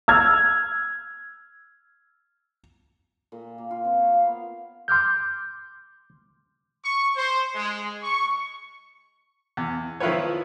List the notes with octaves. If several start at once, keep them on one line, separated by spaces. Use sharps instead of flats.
E6 F6 G#6
A#2
A#3
F4
C4
C#5
F5
B3
C6 D6 F6 G6
C#6
C5
G#3
C#6
E2
D#3 F3 E4 F4 B4 C#5